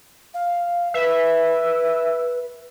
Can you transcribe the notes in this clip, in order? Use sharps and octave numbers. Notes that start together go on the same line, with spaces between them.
F5
B4 E5